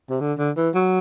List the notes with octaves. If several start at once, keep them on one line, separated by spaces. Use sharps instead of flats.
C3
D3
D3
E3
F#3